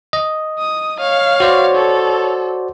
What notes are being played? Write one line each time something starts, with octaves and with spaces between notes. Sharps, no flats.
D#5
D#6
C#5 F5
F#4 C5 D5
A4